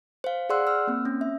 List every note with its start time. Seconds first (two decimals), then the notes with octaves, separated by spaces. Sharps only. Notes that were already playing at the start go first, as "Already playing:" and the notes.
0.24 C5 F5
0.49 G#4 D5 F#5 C6 E6 F#6
0.67 E6 F6
0.87 A#3 C4
1.05 C#4
1.21 E5